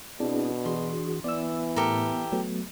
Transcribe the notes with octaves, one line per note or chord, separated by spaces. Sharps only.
B2 C4 D4 E4 G#4
E3 F#4 G#4 C6
E3 B3 D5 E6
A2 G4 A4 A#4
F#3 A3 B3